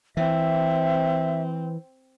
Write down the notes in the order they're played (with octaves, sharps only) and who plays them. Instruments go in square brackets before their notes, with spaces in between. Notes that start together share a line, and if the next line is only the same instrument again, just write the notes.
[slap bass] E3 [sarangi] C4 [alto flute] E5